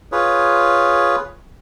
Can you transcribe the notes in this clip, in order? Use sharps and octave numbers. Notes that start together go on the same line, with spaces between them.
F4 G#4 B4 C#5